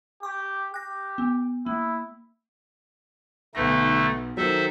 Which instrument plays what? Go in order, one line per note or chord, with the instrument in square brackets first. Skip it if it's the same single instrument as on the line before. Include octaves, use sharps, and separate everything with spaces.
[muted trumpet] G4 [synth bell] C#6 D6
[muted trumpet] G4 [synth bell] F#6 A#6
[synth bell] B3
[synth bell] A#3 [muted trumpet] E4
[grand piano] B1 B3 A#6 [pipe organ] D3 A3 D#4
[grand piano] D#3 F#3 [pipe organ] A4 C5 E5